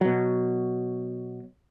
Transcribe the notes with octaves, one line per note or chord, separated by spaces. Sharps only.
B2 F#3